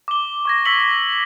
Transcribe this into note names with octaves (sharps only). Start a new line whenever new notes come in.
D6 G7
C#6 G#6 A#6
C#6 E6 B6 C#7 F#7 G7